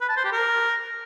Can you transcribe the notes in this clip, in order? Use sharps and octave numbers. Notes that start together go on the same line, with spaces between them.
B4
A5
C5
G4
A#4